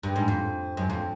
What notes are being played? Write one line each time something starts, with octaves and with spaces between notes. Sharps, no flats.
G2
G#2
F2
F#2
F2